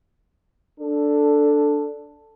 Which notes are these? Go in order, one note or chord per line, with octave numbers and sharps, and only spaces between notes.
D4 A4